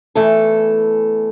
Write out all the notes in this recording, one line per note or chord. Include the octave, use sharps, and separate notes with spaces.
E2 E3 A3 A4